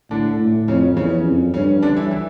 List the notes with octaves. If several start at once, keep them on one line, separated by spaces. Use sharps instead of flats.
A2 D3 D4
A2
F2 C#3 C#4
E2 C#3 C#4
F2
G2 C#3 C#4
D3 D4
E3 E4
E3 E4